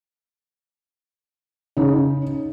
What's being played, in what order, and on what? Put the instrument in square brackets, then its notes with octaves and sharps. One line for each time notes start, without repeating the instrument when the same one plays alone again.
[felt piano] C#3 D#4